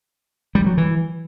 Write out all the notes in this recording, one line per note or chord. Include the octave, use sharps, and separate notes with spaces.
G3
F#3
E3